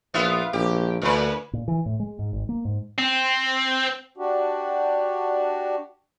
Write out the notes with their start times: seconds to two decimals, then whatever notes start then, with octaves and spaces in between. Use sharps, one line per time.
0.14 A#1 B3 F4 E5
0.53 A#1 G4
1.02 D2 A#2 B4
1.53 A#2
1.68 E3
1.86 A2
2.00 G#3
2.19 G#2
2.33 G#1
2.49 A#3
2.65 G#2
2.98 C4
4.16 D4 F#4 G4